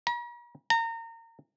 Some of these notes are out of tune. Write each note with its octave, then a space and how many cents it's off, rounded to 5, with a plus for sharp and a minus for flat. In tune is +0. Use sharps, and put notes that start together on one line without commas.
A#5 +45
A#5 -30